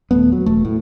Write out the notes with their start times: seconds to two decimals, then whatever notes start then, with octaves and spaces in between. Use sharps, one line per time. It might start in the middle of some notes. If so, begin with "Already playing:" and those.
0.11 D#1 G#1 A3 B3
0.32 F#3
0.46 E1 A3
0.65 A2